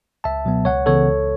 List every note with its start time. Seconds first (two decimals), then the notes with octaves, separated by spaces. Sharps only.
0.24 C#2 E5 A5
0.45 B2 F#3 B3
0.65 C#2 C#5 F#5
0.86 C#3 E3 B3 A4 C#5
1.06 C#2